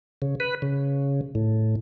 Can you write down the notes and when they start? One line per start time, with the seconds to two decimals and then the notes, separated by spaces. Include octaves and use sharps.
0.22 C#3
0.40 B4
0.62 C#3
1.35 A2